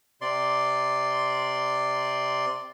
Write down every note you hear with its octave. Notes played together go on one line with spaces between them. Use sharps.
C3 D5 C6